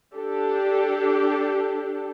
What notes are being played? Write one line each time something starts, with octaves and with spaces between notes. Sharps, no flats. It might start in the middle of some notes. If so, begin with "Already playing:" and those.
D4 G4 A4